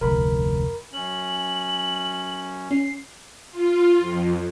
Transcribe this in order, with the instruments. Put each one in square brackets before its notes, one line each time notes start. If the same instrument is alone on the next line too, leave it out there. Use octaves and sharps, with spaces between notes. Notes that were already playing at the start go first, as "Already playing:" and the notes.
[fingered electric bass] F1 D2 [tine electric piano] A#4 B5
[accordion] F#2 C#4 [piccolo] F#7
[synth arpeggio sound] C#4 [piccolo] C7
[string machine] F4
F2